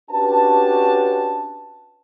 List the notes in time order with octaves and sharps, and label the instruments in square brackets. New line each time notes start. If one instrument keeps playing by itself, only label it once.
[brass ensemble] C#4 D4 F#4 G4 B4 A5